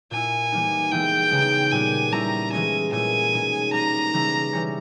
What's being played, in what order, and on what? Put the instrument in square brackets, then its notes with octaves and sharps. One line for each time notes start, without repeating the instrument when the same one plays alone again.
[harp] A#2 A#3 E4 [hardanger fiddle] G#5
[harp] E3 G3 A#3 D#4
[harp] E3 G#3 B3 E4 [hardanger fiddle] G5
[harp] C#3 G#3 B3 D#4
[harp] A#2 G3 B3 [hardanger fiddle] G#5
[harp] G3 C#4 E4 [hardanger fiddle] A#5
[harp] E3 G#3 C#4 [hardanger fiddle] G#5
[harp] A#2 G#3 C#4 E4 [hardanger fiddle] G#5
[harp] B2 G#3 D#4
[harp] G3 A#3 D#4 [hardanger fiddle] A#5
[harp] C#3 E3 G3 C#4 E4
E3 G3 C#4